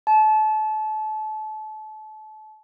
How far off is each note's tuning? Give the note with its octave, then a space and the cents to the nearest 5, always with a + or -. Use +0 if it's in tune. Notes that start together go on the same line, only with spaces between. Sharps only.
A5 -30